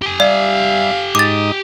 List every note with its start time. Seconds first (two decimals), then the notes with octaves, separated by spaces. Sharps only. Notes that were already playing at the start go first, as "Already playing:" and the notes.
0.02 G4 G#5
0.20 G3 D5 E5 F5
1.15 G#2 D#4 D6 D#6 A6